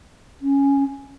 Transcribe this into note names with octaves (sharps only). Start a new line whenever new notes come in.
C#4